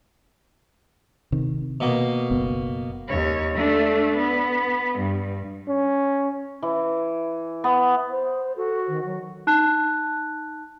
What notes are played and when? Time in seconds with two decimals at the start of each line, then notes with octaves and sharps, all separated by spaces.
1.32 C3 D#3
1.80 B2 A#3
2.31 F#1 B3
3.09 D#2 C#5
3.54 A3 D4
4.17 B3
4.98 G2
5.69 C#4
6.63 E3
7.64 B3
8.10 C5
8.57 F#4 A4
8.88 D#3
9.05 F#3
9.47 D#4 A5 F#6